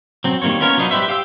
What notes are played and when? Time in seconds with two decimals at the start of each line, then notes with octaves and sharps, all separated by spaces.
0.24 F#3 C4
0.42 D#3 G3 A#3 C4 C#5
0.60 B3 C#4 F4 A#4 C#5
0.77 F#3 B3 D4 D#4
0.91 G3 G4 B4 C5 E5
1.08 G4 F5 G5 E6